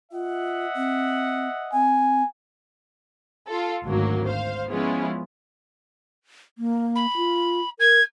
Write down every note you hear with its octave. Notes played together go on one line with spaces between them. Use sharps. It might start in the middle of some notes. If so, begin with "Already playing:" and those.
F4 D#5 E5 F#5
C4
C4 G#5
F4 A4
G#1 D2 F#3 A#3
C5 F5
F3 G#3 B3 C#4 E4 F4
A#3
B5
F4
A#4 G#6